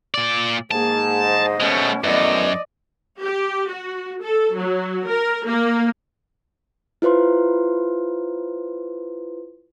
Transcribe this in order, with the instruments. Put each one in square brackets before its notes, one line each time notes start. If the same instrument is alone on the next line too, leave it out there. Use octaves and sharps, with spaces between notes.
[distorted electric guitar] A#2 D5
[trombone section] G#2 [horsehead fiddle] A#3 G#4 [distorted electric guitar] A5
[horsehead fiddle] C5 D#5
[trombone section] B2 C#4 [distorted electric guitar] G#3 A3
[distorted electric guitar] F#2 [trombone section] E3 A3 B3 [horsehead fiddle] D5 D#5
[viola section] G4
F#4
A4
F#3
A#4
A#3
[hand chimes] E4 F4 B4 C5 C6